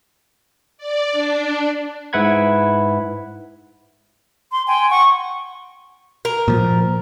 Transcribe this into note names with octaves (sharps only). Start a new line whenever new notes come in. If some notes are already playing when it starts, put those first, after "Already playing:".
D5
D4
G#2 E4 B4 F#5 B5 G#6
C6
G5 G#5 C6
F#5 C#6
A#4
A#2 F3